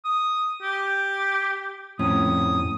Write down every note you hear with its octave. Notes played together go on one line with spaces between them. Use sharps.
D#6
G4
F2 A2 C#4 D#6